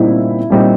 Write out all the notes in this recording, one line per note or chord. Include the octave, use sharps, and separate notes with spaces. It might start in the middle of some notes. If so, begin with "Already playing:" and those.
Already playing: A#2 G3 C4 D#4 E4
A#2 G3 C4 D#4